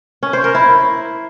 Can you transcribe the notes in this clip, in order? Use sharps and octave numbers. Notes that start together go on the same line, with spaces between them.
C#4
C5
A#4
E4